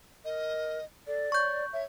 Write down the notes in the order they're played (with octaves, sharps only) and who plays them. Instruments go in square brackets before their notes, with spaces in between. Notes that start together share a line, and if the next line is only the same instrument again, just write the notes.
[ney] A#4 [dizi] D#5
[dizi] A4 [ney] D5
[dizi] C#5 [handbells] C#6 G6
[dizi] C#5 [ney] E5